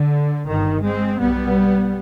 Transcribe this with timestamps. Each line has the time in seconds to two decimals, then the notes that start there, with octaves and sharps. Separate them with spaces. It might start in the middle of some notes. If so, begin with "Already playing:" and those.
Already playing: D3
0.48 G1 G2 D#3
0.84 G#3 C4
1.20 B1 B2 G3 B3